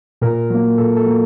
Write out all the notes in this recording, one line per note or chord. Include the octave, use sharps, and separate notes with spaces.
A#2 A#4
F#3 A#3
A#2 A4
A4
F#3 A#3